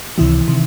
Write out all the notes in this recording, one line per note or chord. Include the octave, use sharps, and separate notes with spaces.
C#2 C3 D#3 E3 E4
C3 D#3